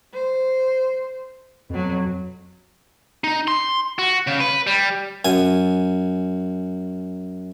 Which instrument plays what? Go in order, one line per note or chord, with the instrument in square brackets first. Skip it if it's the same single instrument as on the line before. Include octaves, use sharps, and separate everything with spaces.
[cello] C5
[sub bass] F2 [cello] B2 F#3
[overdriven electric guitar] D#4
C6
F#4
C#3
B4
G3
[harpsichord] F#2 G#5